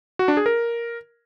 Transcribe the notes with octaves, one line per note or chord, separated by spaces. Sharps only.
F#4
D4
G#4
A#4